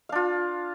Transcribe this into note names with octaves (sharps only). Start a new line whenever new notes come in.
D4 F4 F5